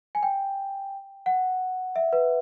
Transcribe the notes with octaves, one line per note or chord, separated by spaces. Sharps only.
G#5
G5
F#5
E5
B4